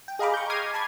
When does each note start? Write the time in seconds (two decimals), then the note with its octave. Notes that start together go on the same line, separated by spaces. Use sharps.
0.08 G5
0.19 G#4 D#5 F5 A#5 B5 D6
0.34 C#6 G6
0.50 D6 F6 G#6 A#6 C7 D#7
0.74 A5 B5 G#6